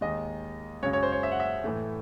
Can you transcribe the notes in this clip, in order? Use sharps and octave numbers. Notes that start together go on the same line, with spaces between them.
D#2 D#3 G#3 D#5
F#2 C#3 G#3 C#5
C#5
C5
C#5
E5
F#5
E5
A2 E3 A3